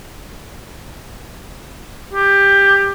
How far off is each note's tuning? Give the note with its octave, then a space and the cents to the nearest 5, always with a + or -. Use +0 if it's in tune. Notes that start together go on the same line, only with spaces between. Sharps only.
G4 +15